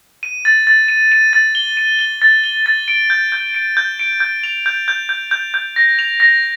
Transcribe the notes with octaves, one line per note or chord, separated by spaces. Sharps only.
D#7
A6
A6
D#7
D#7
A6
G7
D#7
G7
A6
G7
A6
D7
G6
G6
D7
G6
D7
G6
F7
G6
G6
G6
G6
G6
A#6
F7
A#6